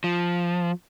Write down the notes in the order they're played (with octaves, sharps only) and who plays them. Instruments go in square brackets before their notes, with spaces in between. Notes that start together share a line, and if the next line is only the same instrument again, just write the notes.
[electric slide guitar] F3